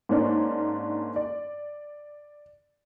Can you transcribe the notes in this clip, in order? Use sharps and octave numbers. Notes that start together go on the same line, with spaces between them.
G#2 A#3 C#4 D4
D5